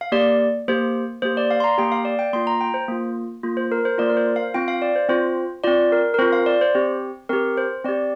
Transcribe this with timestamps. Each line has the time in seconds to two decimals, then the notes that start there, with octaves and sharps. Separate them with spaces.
0.01 F5
0.12 A#3 G4 D5
0.68 A#3 G4 C5
1.22 A#3 G4 C5
1.37 D5
1.51 F5
1.60 C6
1.64 A#5
1.78 A#3 G4 G5
1.92 F5
2.05 D5
2.19 G5
2.33 A#3 F4 C6
2.47 A#5
2.61 G5
2.74 C5
2.88 A#3 F4
3.43 A#3 F4
3.57 C5
3.72 A#4
3.85 C5
3.98 A#3 F4 D5
4.09 A#4
4.17 C5
4.36 F5
4.54 C4 F4 G5
4.68 F5
4.82 D5
4.96 C5
5.09 C4 F4 C5
5.64 C4 F4 D5
5.92 A#4
6.14 A#4
6.19 C4 C5
6.22 F4
6.33 F5
6.46 D5
6.61 C5
6.75 C4 G4
7.29 C4 G4 A#4
7.57 C5
7.85 C4 G4 D5